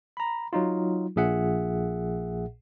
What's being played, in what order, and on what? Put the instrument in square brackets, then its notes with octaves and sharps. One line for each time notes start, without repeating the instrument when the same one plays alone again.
[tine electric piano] A#5 B5
F#3 D#4 F4
A#1 A#2 G#4 E5 F#5